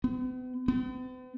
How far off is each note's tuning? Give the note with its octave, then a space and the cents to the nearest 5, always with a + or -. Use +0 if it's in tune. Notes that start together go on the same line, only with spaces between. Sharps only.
B3 +45
B3 +45